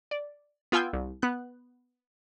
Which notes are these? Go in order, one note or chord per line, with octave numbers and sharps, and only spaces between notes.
D5
B3 F4 G5 G#5 E6 G6
C2
B3 F#6